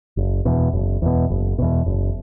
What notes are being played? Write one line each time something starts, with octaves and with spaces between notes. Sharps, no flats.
F#1
E2 B2
F#1
E2 B2
F#1
E2 B2
F#1